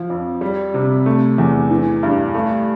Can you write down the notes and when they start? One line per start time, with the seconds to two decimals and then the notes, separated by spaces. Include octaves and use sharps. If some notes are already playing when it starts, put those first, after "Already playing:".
Already playing: F3
0.10 F2
0.41 G3
0.74 C3
1.06 A3
1.38 E2
1.70 E3
2.03 G2
2.35 A3